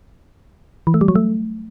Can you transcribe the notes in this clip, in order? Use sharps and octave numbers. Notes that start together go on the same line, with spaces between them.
E3
A3
G3
F#3
A3